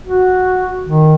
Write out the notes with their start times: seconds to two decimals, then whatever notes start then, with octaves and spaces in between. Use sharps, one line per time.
0.06 F#4
0.87 D#3